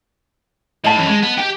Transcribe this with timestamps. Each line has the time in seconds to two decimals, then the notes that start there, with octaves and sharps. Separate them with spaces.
0.84 A2 D#5 A5
0.96 F#2 E3
1.08 G#3
1.23 B3
1.38 G4 G5